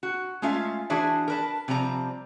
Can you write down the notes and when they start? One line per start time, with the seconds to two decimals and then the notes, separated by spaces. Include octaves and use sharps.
0.03 F#4
0.42 G#3 A3 C#4 F4 E5 F5
0.90 E3 D4 F#4 G#4 C5 E5
1.28 A#4 B4 A5
1.68 C3 F3 G3 C4 A#5